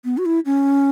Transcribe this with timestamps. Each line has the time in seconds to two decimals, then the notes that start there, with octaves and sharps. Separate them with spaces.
0.05 B3
0.18 F#4
0.25 E4
0.45 C#4